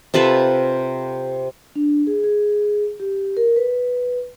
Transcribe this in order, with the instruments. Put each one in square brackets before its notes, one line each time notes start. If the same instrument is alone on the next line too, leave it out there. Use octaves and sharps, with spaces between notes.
[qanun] C3 F4 A4 B4
[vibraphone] D4
G#4
G#4
G4
A#4
B4